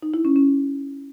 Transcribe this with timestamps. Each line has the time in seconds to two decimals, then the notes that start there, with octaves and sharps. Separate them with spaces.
0.03 D#4
0.14 E4
0.25 C#4
0.36 C#4